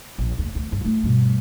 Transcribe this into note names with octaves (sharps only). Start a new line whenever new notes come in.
A#1
F1 D#2
D2
C2 G2
A3 F4
G2 B2